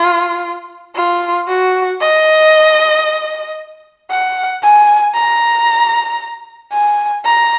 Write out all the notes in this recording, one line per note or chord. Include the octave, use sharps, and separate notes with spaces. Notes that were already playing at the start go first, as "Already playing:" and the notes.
Already playing: F4
F4
F#4
D#5
F#5
G#5
A#5
G#5
A#5